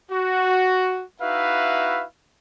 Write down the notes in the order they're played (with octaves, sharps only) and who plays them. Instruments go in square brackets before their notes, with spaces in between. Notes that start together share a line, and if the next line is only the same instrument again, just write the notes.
[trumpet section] F#4
D#4 E4 F#4 B4 E5 F5